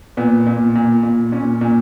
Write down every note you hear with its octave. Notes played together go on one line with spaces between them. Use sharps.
A#2 B3
A#2
A#2
A#2
A#2 C#4
A#2